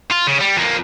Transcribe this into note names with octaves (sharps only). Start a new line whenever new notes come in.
F4
C#3
G3
F2 A#3